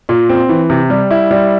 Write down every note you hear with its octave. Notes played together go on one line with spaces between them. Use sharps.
A#2
C4
E3
C3
G3
E4
G3